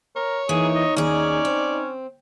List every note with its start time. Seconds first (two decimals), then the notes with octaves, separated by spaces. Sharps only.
0.16 A#4 C#5
0.49 E3 A#3 D#4 G#4
0.74 D#5
0.97 D#2 C#4 G#4 D5
1.45 C4